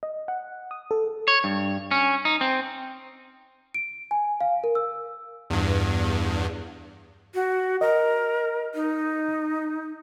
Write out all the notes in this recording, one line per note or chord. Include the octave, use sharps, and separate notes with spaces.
D#5
F#5
D#6
A4
C#5
G2
C#4
D#4
C4
D7
G#5
F5
A#4
E6
E2 G2
F#4
A#4 D#5
D#4